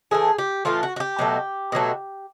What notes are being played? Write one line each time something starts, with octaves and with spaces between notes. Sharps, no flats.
A2 E3 A3 G#4
G4
A2 E3 A3 F4
F#4
F#4
G4
B2 F#3 A3
B2 F#3 A3